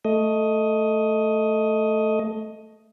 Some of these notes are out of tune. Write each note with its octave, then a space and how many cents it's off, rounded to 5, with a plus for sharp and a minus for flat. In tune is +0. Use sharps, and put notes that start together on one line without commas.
A3 +0 D#5 +10